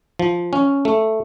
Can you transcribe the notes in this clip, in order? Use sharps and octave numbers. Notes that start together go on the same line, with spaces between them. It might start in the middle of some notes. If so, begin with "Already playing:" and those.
F3
C#4
A3